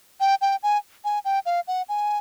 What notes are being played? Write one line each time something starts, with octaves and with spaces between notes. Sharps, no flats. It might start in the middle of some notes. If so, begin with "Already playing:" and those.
G5
G5
G#5
G#5
G5
F5
F#5
G#5